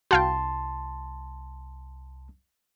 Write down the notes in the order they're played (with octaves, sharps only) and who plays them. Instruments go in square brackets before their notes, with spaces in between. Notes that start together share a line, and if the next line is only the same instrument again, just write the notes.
[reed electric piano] C2 A5 C6 [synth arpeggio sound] F#4 F5 G5